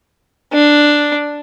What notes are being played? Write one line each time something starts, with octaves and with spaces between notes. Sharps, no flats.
D4